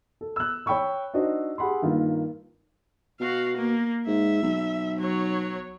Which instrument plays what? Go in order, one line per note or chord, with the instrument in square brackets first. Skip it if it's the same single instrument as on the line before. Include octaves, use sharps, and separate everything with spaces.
[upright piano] A4
E6 F#6
C#5 G5 B5 C#6 E6
D4 D#4 F#4 C5 D#5
G4 G#4 F#5 B5 C6
G2 D#3 A#3 F4
[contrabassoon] B2 [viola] F#4 F5
[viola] A#3
[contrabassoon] G#2 [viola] E5
[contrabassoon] B1
[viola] F#3 C#5